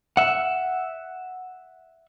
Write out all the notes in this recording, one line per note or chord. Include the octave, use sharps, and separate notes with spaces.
E5 F#5